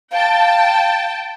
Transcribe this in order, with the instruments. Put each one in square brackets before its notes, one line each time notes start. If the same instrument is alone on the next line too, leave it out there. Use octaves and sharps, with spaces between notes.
[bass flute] F5 [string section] G5 A5